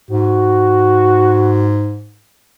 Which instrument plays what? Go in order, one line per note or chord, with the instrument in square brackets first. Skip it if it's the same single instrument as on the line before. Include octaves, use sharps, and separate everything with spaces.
[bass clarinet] G#2 [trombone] F#4